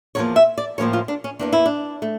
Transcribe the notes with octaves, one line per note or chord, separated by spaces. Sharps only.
E2 D3 F3 A#3 C#5
E5
D5
A2 F3 A#3 C#4 C#5
F4
D4
C#4
E2 E3 A#3 D4
E4
D4
A3